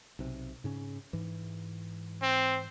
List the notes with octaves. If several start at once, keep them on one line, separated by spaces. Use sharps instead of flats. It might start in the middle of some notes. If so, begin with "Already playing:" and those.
B1 C3
G#2 C#3 C#4
G#2 E3
C4